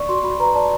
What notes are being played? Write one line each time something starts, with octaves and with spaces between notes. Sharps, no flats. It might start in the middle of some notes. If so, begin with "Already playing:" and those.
Already playing: D5 C#6
F#4 C6
F#4 B5
B4 A#5
D5 A5